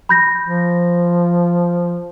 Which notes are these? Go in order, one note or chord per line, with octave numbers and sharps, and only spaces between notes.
B5 G6 A#6
F3